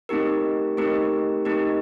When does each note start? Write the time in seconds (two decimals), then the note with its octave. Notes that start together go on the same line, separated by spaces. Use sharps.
0.09 A3 C4 D#4 G4 A#4
0.77 A3 C4 D#4 G4 A#4
1.45 A3 C4 D#4 G4 A#4